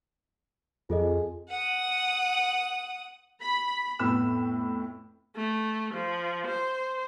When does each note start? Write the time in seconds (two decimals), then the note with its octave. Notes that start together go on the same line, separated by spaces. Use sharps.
0.90 F2 F4 G#4 A4 D#5
1.48 F#5 D#6
3.41 B5
3.99 F2 A2 B3 B5 E6 E7
5.36 A3
5.93 F3
6.47 C5